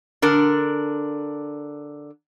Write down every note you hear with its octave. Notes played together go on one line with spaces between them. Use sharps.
D3 D4 A#4